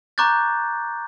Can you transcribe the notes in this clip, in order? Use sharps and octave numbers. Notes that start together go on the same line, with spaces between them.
A#5 C#6 D6 F#6 G6 A6